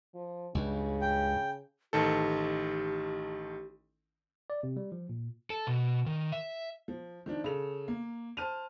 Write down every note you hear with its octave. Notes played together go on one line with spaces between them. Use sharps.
F3
C#2 G2 C#3
G5
A1 D#3 G4 A4
D5
C3
G3
F3
A#2
A4
B2
D#3
E5
F3
D#3 F3 D4
C#3 A4 F7
A#3
C5 A5 F6 D#7 F7